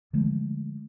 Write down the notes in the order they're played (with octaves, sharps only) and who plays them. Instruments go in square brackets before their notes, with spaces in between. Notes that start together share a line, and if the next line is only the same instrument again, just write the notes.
[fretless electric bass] D3 F3 G#3 A3